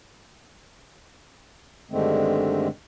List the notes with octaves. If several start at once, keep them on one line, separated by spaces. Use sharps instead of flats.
G2 D3 D#3 G#3 A3 C4